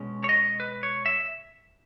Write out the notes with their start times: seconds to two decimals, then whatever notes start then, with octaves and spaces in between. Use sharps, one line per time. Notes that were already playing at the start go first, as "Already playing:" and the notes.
Already playing: B2 G#3 C#4
0.24 C#5
0.29 D#5
0.60 B4
0.83 C#5
1.06 E5